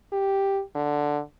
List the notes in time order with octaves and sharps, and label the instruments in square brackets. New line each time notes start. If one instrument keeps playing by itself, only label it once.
[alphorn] G4
D3